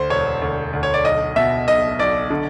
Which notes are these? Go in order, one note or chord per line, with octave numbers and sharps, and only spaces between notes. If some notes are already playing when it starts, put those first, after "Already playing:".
Already playing: D2 C5
E1 C#5
D2
D2
C#5
D5
B1 D#5
B2 E5
B1 D#5
B1 D5
D3